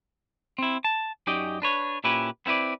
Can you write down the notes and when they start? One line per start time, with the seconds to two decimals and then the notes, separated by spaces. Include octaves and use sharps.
0.58 C4 E4
0.84 A5
1.27 F#2 C#4 D#4 G4 D5 D#5
1.62 D4 B4 C#5
2.04 A#2 C#4 E4 G4 B4
2.46 B3 C4 E4 B4 D5